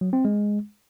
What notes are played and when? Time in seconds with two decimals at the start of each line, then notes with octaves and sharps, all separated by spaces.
0.01 F#3
0.13 C4
0.25 G#3